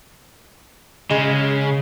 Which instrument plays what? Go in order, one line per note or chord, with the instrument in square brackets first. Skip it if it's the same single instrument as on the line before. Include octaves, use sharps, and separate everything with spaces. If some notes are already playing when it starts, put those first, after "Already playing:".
[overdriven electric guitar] C#3 [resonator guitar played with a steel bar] G#3